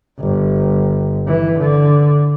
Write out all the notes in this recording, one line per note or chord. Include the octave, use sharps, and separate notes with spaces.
G1
E3
D3